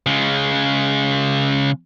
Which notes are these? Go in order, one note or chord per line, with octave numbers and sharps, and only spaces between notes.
C#3 G#3